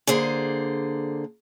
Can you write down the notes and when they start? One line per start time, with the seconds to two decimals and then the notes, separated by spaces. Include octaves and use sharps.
0.07 D3 A#3 G#4 C5